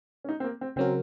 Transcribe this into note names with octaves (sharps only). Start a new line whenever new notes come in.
C#4
D#4
C4
A#3
C4
C#3 F#3 C4 C#4 F#4 A#4